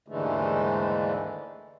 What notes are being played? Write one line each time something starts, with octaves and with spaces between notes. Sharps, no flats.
D#2 G#2 D3 E3 G#3 A3